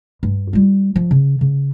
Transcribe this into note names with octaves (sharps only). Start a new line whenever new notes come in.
G2
G3 F4
F3
C#3
C#3